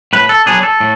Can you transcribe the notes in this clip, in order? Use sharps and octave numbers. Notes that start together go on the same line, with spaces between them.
A2 B4
A4
F#3 B3 D4 G#4
A4
A2